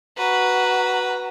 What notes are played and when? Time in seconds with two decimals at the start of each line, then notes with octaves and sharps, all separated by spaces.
0.18 F#4 B4 A#5